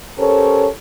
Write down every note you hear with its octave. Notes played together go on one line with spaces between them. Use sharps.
C#4 G4 A4 A#4 C5 C#5